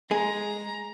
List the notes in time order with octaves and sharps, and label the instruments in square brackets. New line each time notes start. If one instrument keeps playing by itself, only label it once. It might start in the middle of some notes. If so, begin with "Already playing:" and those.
[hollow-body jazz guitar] G#3 G#4 [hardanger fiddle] A#5